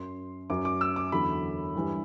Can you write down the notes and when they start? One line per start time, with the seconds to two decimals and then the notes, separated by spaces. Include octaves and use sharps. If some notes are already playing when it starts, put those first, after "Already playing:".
Already playing: F#2 F#3 C6
0.50 F#2 F#3 D6
0.65 D6
0.81 E6
0.96 D6
1.12 E2 D3 F#3 B5
1.75 G2 E3 G3